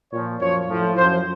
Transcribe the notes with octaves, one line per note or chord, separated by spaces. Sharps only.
A#2 F3 C#5
F#2 F3 C#5
A2 F3
F#2 F3 C5